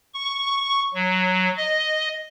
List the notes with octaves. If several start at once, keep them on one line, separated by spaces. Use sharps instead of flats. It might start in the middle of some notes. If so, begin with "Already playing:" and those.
C#6
F#3
D#5